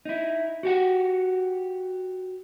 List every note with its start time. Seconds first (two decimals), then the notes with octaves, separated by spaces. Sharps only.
0.05 D#4 E4
0.63 F#4 G4 F#5